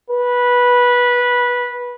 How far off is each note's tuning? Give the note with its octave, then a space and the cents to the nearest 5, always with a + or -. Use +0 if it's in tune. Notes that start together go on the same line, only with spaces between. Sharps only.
B4 -15